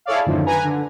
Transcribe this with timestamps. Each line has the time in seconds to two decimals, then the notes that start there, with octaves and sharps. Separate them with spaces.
0.06 E4 G#4 A4 C#5 D5 F5
0.26 F#2 A2 D3 D#3 F3
0.46 B4 G#5 A#5
0.64 D3